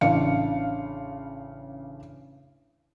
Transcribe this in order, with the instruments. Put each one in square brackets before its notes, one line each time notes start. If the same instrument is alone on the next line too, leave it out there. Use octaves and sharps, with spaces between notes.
[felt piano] A1 C#3 D4 F5 C#7